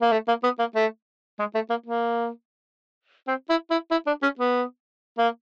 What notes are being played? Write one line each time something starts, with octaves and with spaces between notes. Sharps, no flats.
A#3
A3
A#3
B3
A#3
A3
G#3
A3
A#3
A#3
C4
E4
E4
E4
D4
C#4
B3
A#3